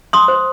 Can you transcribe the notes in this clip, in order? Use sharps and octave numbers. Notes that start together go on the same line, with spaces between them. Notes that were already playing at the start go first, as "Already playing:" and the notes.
C6 D#6
C5